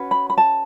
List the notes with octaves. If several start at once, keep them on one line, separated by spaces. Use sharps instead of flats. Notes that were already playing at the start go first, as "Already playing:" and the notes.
Already playing: C#4 F#4 B4
B5
B5
A5